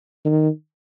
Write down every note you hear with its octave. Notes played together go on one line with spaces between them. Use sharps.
D#3